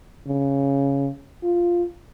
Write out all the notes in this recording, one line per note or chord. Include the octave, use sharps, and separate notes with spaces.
C#3
F4